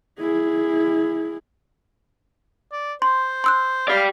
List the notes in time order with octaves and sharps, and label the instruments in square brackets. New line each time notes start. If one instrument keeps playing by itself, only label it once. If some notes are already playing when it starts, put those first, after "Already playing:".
[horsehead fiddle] E4 G#4
[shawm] D5
[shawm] C5 [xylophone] C6
[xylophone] C6 E6 F#6
[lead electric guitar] G4 D5 [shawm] F5